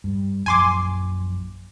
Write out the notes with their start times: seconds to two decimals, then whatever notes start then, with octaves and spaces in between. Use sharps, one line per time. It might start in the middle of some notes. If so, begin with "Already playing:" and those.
0.04 G2
0.46 A#1 F#2 F3 G#5 C6 D6